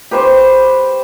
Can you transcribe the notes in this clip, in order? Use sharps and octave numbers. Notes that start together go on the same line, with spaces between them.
G4 B4 C5 C#6